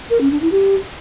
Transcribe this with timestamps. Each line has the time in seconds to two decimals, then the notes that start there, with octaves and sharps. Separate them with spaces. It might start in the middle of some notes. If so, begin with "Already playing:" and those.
0.10 A#4
0.21 C#4
0.31 D4
0.42 E4
0.52 G4